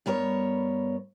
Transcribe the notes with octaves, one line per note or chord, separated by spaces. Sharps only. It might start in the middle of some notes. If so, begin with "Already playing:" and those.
G2 B3 A#4 C#5